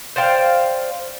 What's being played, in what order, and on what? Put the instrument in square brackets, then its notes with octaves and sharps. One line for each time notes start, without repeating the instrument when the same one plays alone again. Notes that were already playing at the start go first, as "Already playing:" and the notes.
[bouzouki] C5 D5 F5 G5